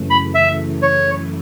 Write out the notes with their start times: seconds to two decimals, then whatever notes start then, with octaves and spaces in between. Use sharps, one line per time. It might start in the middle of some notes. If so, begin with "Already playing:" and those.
Already playing: F#2 C#3 E3 A3
0.10 B5
0.35 E5
0.82 C#5